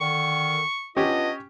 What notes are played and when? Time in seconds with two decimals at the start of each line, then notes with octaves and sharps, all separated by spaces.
0.01 D3 D#3 C#6
0.97 B3 C#4 D4 F4 G4 D#5